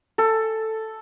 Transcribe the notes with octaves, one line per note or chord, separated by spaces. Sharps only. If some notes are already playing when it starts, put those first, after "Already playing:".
A4